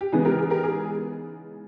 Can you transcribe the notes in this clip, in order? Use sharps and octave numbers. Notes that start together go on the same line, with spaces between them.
G4
C#3 E3 G#3 B3 D#4 G#4
G4 A#4
G#4
G4 A#4
G#4